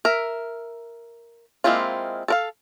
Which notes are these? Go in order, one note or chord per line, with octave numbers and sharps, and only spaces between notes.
A#4 E5
G#3 A#3 C4 E4 F4
A4 A#4 F5